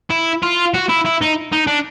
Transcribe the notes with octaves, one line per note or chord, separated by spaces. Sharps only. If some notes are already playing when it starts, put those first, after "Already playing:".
E4
F4
F#4
E4
E4
D#4
D#4
D4